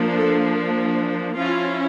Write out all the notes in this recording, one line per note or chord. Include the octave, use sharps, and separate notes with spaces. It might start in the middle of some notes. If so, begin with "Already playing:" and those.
Already playing: F3 A#3 D4
A4
F3 C#4 E4 F4